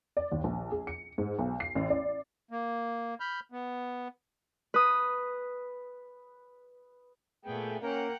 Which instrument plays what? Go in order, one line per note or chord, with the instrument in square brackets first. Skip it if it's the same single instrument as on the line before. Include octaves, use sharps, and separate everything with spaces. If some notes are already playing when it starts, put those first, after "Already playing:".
[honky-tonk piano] D5
D#2
A#1
G#4
C#7
G#2
B1
C7
A1
D5
[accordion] A#3
B5 F6 G6
B3
[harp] B4 D#6
[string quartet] A#2 B3 [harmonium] A3 G#4 G5
[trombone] A#3 [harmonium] C#4 [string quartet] F#5 G5 A#5